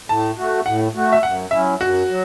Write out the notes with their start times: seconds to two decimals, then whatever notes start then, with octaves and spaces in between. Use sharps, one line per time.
0.09 A2 A5
0.37 A3 F#4
0.65 A2 F#5
0.95 A3 F#4
1.13 E5
1.23 F#2 F#5
1.51 F#3 C#4 E4 E5
1.80 F#2 F#4
2.09 F#3